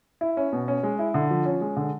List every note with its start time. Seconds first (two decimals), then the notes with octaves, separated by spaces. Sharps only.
0.21 E4
0.37 C#4
0.52 B2
0.68 C#4
0.83 G#3
0.99 E4
1.14 D3
1.30 F3
1.45 C#4
1.61 G#3
1.77 D3